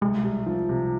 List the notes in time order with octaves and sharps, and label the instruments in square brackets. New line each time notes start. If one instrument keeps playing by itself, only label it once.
[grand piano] C2 [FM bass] G#3
[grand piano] C2
F3
C3